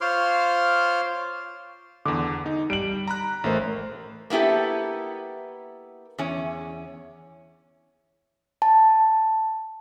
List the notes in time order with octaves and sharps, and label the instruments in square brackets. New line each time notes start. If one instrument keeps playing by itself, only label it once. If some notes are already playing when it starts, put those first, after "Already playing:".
[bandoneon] F4 C5 C#5 C6 D6 F6
[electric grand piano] E2 D3 [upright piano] D6
[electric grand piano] D#4
[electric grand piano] G3 [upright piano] D7 F#7
[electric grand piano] A#5 B5 F#6
[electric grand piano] A1 C5 [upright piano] A3 A#4
[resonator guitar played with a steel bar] A#3 B3 E4 G4 A4
E2 C#4
[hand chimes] A5